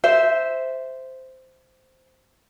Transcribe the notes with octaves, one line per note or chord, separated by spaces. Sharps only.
C5 E5